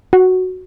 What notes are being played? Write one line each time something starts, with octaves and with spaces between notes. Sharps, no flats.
F#4